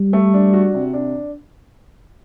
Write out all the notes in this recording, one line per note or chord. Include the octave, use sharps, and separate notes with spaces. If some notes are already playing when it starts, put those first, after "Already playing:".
Already playing: G3
A3
D4
F#4
C3
D4